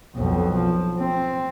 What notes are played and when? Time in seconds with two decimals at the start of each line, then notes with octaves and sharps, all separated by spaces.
0.16 B1 F2
0.58 F3
0.99 C4